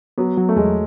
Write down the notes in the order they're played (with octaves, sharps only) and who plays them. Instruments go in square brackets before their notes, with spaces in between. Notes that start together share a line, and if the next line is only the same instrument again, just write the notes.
[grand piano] F#3 [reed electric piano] B3
[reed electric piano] F#3
[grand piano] A3
[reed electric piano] E2 [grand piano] G#3